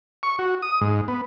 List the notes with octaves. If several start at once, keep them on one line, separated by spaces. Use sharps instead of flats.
C#6
F#4
D#6
G#2
B3